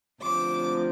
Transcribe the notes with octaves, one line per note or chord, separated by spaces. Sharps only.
D2 C3 F3 D6